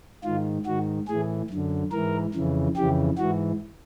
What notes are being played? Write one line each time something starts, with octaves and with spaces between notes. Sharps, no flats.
G#2 D#3 F4
G#2 D#3 F#4
A2 E3 G#4
F#2 D3
G#2 E3 A#4
F2 C#3 E3
F2 C#3 E3 G4
G#2 E3 F#4